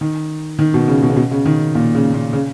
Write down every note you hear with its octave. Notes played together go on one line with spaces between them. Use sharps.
D#3
D#3
B2
C#3
B2
C#3
B2
C#3
D#3
A#2
C#3
A#2
C#3